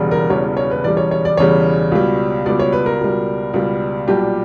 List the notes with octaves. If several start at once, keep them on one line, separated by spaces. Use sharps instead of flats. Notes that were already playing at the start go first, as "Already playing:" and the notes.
Already playing: E1 E2 C#3 G3
A#4
E1 E2 C#3 G3 C#5
C#5
B4
E1 E2 C#3 G3 D5
C#5
C#5
D5
E1 E2 C#3 G3 C#5
C#2 B2 G3
C#2 B2 G3 D5
C#5
B4
A#4
C#2 B2 G3
C#2 B2 G3
B1 A#2 G3 G4